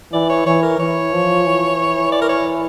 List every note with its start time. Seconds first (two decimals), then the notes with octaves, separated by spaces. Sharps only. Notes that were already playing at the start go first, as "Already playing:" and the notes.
0.12 E3 D5
0.30 C#5
0.46 E3 C#5
0.63 A#4
0.79 E3 C#5
1.13 F3
1.46 E3
2.12 D5
2.21 A#4
2.29 C#5